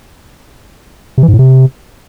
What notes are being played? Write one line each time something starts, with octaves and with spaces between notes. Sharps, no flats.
C3
E3
G#2
A2
C3